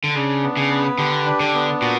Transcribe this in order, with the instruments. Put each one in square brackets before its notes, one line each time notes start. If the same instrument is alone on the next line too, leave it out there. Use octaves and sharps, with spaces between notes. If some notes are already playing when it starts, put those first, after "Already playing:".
[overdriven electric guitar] D3
[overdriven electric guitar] C#3 [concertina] D4
[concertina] B3
[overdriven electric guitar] C#3
[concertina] B4
[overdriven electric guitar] D3 [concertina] G4
[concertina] D4
[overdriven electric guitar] D3
[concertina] B3
[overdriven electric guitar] A#2 [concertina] F#4